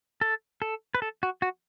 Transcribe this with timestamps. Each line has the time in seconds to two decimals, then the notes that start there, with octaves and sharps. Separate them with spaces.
0.21 A4
0.62 A4
0.95 B4
1.02 A4
1.23 F#4
1.42 F#4